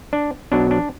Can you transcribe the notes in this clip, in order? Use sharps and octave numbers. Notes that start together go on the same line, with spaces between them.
D4
B1 B2 F#3 D4
D4